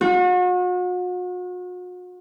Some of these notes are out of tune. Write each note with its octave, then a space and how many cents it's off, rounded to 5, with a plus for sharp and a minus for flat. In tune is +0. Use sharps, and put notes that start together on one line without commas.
F#4 -40